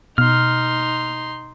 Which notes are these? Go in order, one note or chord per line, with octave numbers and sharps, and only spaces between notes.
B2 D#4 C6 F6